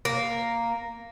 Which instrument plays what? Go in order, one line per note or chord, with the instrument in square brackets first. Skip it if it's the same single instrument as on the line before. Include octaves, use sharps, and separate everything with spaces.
[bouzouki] A#3